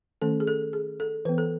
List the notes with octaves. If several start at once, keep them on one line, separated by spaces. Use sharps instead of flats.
D#3 A3 C#4 A4
G#4
A4
G#4
A4
E3 B3 B4
A4